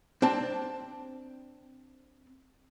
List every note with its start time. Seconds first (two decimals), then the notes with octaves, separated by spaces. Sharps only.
0.22 C4 D4 A5